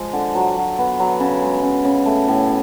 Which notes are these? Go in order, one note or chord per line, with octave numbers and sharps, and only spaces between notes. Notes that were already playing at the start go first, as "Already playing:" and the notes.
Already playing: F3 G#3
D3
F#3
F#3
B3
F#3
C#3
G#3
C#3
C#3
A3
A2